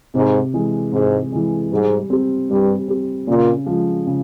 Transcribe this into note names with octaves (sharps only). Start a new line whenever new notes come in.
G#2 C3
E3 G#3
G#2 C3
E3 G#3
G#2 G3
C4 G4
G2 G3
C4 G4
A#2 C#3
F3 G#3
C#3